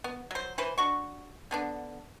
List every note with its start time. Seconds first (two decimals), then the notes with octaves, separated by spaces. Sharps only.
0.04 B3
0.31 F#3 C5
0.58 E3 B4 C5
0.78 D4 F#4 C#6
1.51 D3 B3 D4